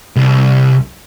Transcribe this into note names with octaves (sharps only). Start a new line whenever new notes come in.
C2